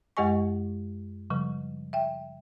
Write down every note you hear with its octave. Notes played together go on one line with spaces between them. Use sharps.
F#2 G#3 G4 D#5 G#5 C#6
C#3 F3 G3
E5 G5